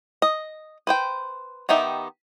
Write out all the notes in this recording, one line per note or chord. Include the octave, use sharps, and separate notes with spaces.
D#5
B4 C5 G5
D#3 B3 D#4 G4 E5